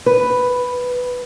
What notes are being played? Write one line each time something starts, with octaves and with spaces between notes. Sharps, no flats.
B4